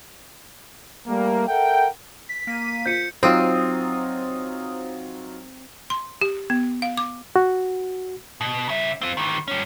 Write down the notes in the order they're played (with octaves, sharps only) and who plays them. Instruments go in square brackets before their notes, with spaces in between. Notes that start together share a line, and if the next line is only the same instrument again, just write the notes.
[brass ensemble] G3 A3 A#3
A4 A#4 E5 F#5 G5
[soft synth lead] B6
[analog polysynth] A#3 D#7
[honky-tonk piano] F4 C5 [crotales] G6 C#7
[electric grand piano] F#3 D#4 F4 [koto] C4 [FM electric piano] C5 D#6
[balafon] C6
G4
B3
F5
D6
[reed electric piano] F#4
[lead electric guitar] B2
C#3 E5
C4 F4
D#3 E3
G2 C#4